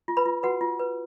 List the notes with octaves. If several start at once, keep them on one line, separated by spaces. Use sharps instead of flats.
F4
B4 B5
F4
F#4 B4 F#5
F4
B4